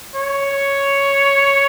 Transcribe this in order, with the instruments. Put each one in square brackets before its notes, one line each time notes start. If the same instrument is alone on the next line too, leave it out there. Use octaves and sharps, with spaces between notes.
[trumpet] C#5